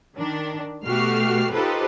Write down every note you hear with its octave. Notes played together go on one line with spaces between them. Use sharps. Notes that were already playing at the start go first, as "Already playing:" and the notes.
D#3 D4
B2 A3 F#4 G4 F6 C7
D#4 F4 G4 A4 B4 C5